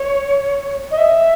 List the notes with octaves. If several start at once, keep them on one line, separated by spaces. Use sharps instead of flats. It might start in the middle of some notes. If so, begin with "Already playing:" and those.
Already playing: C#5
D#5
E5